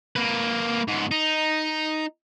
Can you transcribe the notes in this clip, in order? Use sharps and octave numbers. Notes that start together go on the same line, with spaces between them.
A#3 B4
G#2 B3
D#4